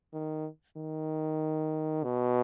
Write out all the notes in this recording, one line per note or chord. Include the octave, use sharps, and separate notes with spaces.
D#3
D#3
B2